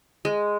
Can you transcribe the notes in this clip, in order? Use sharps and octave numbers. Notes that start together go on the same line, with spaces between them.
G#3